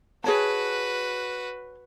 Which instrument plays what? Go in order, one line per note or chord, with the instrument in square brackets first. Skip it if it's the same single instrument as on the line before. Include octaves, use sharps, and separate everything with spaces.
[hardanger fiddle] F#4 B4 [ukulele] G#4 C#5 A5